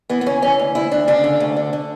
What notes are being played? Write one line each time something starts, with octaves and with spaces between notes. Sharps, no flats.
E3 B3
B3
C#3 C#4
E3 C#4
D2
D2 E4
D2 D4
C#3 D4
D3
D2
D3
D3